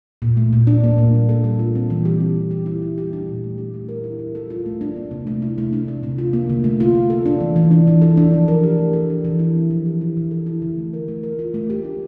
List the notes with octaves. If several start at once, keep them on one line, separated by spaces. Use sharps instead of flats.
A#2
A3
A#2
D4
A#3
A#2
G3
A4
G3
F4
C4
E3
G4
C4
E3
G4
E4
G3
G4
D4
A#2
A3
G4
A3
A#4
E4
G3
A4
F4
A3
D4
A#3
C3
A3
E4
A3
D4
A3
C3
F4
A#3
D3
A3
F4
A3
A4
D4
E3
E3
D4
E3
A4
D4
F3
A#4
G4
A3
A4
D4
E3
E4
C4
F3
G4
E4
E3
A4
E4
D3
A3
A#4
A3
A#4
F4
A3
G4
D4